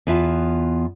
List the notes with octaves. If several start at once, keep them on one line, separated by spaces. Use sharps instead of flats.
E2 B3 F4 E5 A5